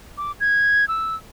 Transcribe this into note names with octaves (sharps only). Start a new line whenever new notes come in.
D6
G#6
E6